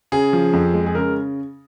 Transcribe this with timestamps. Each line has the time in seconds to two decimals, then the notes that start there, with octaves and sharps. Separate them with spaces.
0.12 C#3 G#4
0.33 F3
0.53 F2
0.74 G#3
0.86 G#4
0.95 C#3 A#4